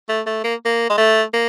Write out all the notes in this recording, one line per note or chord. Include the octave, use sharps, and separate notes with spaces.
A3
A3
A#3
A#3
G#3
A3
A#3